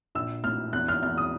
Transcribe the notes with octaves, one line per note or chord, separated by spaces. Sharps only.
A#1 E6
A2 F6
E2 F#6
F6
E2 F6
D#6